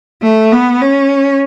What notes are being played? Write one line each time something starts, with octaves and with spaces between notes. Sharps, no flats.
A3
B3
C#4